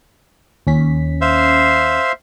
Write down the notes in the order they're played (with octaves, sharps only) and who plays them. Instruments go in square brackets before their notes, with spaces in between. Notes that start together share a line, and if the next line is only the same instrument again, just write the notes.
[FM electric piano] D#2 C#4 B6
[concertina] C5 E5 F5